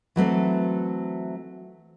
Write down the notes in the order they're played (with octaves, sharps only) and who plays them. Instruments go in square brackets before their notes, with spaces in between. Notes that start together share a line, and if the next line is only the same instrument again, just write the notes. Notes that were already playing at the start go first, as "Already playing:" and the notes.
[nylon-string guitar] E3 F#3 A3 C4